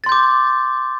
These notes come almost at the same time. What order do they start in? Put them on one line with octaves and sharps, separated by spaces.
A6 C6 G6 D6